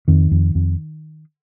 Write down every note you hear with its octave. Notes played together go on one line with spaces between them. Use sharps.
F2 D#3
F2
F2